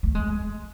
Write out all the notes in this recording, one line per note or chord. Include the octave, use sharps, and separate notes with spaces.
A3
G#3